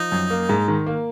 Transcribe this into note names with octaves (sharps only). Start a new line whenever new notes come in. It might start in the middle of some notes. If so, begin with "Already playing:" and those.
Already playing: F3 D#4
F#2
A#3
G#2
D#3
A#3